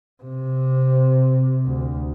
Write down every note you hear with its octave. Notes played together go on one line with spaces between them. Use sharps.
C3
D2